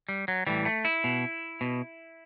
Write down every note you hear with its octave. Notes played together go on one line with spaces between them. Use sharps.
G3
F#3
A2 E3 G3
A3
E4
B2
B2